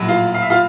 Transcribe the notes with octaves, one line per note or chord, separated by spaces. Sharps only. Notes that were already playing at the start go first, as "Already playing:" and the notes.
Already playing: A#1 A2 F#3
F4 F5
F5
E5
F4 F5